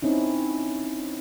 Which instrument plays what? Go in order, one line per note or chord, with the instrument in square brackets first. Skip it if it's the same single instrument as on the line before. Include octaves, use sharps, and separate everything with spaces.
[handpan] C4 C#4 D#4 E4